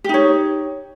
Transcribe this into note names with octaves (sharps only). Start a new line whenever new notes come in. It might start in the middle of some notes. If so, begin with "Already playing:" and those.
D#4 G4 C#5